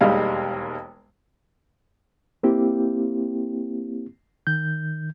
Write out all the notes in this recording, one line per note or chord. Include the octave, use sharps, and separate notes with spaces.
E1 D#2 G3 G#3 F5
A#3 C4 E4 G4
D#3 G6